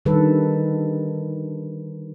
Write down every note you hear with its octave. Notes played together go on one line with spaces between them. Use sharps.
D3 D#3 G3 A4 B4